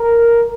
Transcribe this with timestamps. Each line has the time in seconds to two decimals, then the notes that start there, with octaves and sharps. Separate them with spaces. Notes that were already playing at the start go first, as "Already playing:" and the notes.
Already playing: A#4